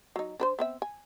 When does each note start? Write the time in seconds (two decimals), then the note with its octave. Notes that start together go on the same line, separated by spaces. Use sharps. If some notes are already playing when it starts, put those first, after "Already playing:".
0.16 F#3 D#4
0.40 D4 B4 C5
0.59 B3 C4 E5
0.82 G#5